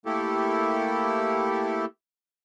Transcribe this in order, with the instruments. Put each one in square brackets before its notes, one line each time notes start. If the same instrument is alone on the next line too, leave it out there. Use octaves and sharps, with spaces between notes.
[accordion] A3 A#3 E4 G4 A4